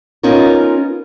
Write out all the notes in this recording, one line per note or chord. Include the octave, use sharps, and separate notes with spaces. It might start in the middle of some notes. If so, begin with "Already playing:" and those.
B3 C#4 D#4 F4 A#4